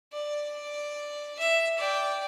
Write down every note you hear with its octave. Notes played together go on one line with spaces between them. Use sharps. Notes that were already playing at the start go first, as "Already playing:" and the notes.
D5
E5
D5 G5